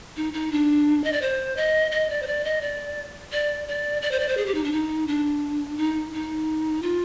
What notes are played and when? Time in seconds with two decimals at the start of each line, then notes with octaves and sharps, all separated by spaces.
0.17 D#4
0.33 D#4
0.52 D4
1.04 D#5
1.13 D5
1.22 C5
1.57 D#5
1.91 D#5
2.10 D5
2.22 C5
2.27 D5
2.44 D#5
2.61 D5
3.32 D5
3.68 D5
4.02 D5
4.11 C5
4.20 D5
4.29 C5
4.37 G#4
4.46 G4
4.55 D#4
4.64 D4
4.72 D#4
5.07 D4
5.77 D#4
6.13 D#4
6.82 F4